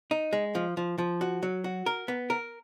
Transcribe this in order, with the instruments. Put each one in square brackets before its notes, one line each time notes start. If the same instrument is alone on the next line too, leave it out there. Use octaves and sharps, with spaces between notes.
[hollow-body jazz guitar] D#4
G#3
F3
F3
F3
F#4
F#3
F#4
A#4
B3
A#4